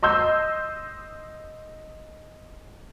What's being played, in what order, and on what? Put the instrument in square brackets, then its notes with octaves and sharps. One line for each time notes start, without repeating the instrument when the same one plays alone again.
[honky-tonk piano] D#5 C6 E6 G6